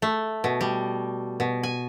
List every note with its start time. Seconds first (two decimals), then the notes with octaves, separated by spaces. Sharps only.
0.02 A3
0.44 B2
0.61 G3
1.40 B2
1.63 G#5